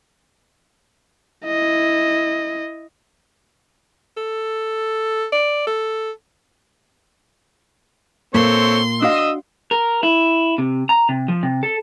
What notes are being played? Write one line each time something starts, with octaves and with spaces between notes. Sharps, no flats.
E4 D#5
A4
D5
A4
A#2 A#3 C4 A4 C#5 C6
D4 F#4 D#5 F5 D#6 E6
A#4
E4
C3
A#5
C3
F3
C3
A4